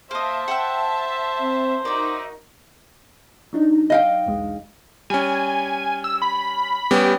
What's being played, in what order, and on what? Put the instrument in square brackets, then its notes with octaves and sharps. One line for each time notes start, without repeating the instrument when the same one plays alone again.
[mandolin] A#3 D#5 [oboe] C5 [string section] E5 A5
[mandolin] F#5 G5 E6
[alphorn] C4
[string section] D#4 F#4 [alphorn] A#4 [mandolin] D5 E5
[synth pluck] F#3 D4 D#4
[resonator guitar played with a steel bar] D#5 F5 G5
[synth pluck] B1 E2 G#3
[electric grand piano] G3 C#4 [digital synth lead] G#5
[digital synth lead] E6
B5
[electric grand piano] G3 B3 C#4 [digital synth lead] G4